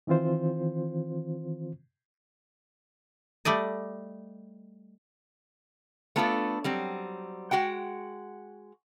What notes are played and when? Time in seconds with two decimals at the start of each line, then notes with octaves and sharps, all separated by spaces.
0.07 D#3 E3 C4 F4 C5
3.45 G3 A3 D5 D#5
6.16 A3 B3 D4 F4 G#4 A4
6.64 F#3 G3 C4
7.51 G#3 F#4 F#5 G5